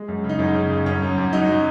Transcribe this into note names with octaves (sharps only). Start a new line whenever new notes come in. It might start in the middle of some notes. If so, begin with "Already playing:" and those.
Already playing: G#3
F#2
C#3
D#4
F#2 C#4
C#3
C#3
F#2 C#4
F#2
F#2
F#3 D#4
F#3